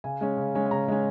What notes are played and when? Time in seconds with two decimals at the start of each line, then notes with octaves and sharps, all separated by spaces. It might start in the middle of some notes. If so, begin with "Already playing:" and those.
0.04 C#3 G#5
0.21 G#3 C#4
0.37 C#3
0.55 G#3 C#4
0.66 G#5
0.71 C#3 A#5
0.88 G#3 C#4